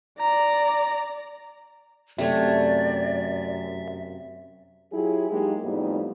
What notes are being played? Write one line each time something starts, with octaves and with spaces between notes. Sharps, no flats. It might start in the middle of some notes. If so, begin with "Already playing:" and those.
D5 A#5
F#2 C3 A3 C#5 D5 E5
F#3 E4 F4 G4 G#4
F#3 G#3 A#3 D#4 G4
F2 A2 G3 B3 D#4 E4